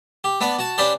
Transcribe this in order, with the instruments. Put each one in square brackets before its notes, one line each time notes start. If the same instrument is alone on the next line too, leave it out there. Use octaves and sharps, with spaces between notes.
[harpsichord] G4
B3 D4 B4 D5
F#4 A5
C#4 D4 G4 B4 C5 D5